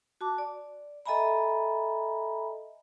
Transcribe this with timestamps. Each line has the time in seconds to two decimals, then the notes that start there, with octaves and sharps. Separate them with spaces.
0.21 F#4 A5 D6
0.38 D5
1.06 A4 D#5 E5 G#5 A#5 B5